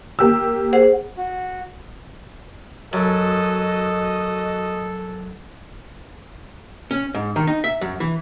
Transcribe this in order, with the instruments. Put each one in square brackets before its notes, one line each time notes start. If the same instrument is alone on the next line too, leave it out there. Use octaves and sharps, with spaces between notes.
[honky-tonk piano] A#3 G4 E6
[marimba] G#4 C5 F#5
[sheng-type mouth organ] F#4
[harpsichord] F#2 [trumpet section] F#4 D#5 [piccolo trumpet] A4
[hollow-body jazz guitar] C#4
G#2
D#3
D#4
E5
F#2
E3